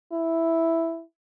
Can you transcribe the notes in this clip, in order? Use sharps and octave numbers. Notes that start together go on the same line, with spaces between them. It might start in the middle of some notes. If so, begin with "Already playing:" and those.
E4